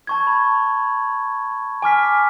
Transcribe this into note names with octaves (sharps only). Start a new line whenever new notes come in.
A5 C#6 G#6
B5
G#5 D6 F6 B6